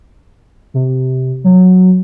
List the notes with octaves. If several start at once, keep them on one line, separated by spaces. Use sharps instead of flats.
C3
F#3